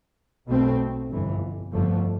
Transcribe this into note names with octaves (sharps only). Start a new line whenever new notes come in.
B1 B2 A3 C4
G1 F2 E3
G1 F2 D3 F3 A3